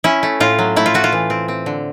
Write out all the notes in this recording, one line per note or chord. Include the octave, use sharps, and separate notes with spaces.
C#4 E4
A3
A2 F4
F#3
A3 E4
F4
A3 F#4
F4
E3
C4
C4
D3